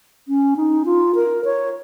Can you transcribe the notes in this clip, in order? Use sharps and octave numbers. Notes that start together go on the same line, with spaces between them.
C#4
D#4
F4
A#4
C#5